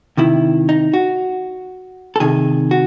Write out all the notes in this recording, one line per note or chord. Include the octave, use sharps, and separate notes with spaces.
C3 D#3 E4
D#4
F#4
A4
C3 D#3 G#4
F#4